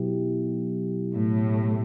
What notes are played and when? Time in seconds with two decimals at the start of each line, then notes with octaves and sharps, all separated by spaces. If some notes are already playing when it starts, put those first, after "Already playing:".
Already playing: B2 F#3 B3 E4 G4
1.14 A2